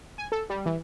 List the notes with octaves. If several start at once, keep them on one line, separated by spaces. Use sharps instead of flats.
G#5
A4
G3
E3